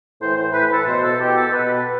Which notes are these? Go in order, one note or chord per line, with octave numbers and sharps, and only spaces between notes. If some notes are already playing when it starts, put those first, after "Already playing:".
A2 E3 C5
C5
A2 E3 B4
A4
B2 C5
A4
B2 G4
A4
B2 B4